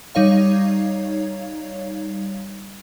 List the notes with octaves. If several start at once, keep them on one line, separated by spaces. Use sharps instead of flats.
G3 D#4 C#5 F5